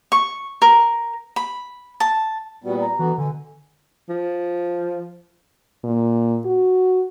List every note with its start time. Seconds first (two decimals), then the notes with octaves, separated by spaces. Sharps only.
0.12 C#6
0.62 A#4
1.36 B5
2.00 A5
2.64 A#2 G3 B3 F#4
2.80 A#5
2.99 D3 E3 B3 F#4
3.18 B2 D3 G#5
4.09 F3
5.84 A#2
6.45 F#4